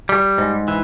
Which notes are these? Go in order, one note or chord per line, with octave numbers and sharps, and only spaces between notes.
G3
G#2
E3